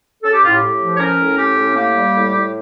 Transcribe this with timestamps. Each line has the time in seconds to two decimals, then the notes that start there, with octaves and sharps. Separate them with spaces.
0.23 C#4 A4
0.33 G4
0.42 A2 F4
0.54 G4
0.61 A2
0.80 F3
0.95 C#5
1.00 C#4 A#4
1.18 A2
1.38 C#4 G4
1.56 A2
1.75 A#3 G4
1.95 G3
2.14 A2
2.33 A2